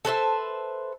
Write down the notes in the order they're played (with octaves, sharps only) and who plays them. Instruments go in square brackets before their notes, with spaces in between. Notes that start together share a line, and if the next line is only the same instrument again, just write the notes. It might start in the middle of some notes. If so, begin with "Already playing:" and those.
[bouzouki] A4 B4 C5 E5